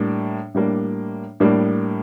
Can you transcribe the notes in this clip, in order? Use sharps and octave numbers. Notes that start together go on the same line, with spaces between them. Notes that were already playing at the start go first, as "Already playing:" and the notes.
Already playing: A2 G3 A#3 D4
A2 G3 A#3 D4
A2 G3 A#3 D4